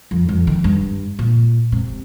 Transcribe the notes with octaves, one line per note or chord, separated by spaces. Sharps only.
F2
F2
D#3
G2
A#2
C3